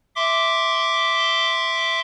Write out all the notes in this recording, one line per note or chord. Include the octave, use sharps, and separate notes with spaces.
E5 C6 D6